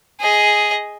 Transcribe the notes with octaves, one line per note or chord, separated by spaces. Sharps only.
G#4 D#5